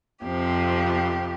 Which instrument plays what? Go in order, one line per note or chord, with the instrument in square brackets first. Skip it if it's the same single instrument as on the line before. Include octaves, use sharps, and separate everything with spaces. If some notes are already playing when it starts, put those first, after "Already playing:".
[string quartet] F2 C3 F3 G4